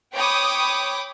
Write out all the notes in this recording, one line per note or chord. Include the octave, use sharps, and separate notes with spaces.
C#5 G5 B5 D6 D#6